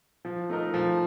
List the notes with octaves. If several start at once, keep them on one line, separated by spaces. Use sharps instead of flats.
F3
A3 D#4 A#4
F3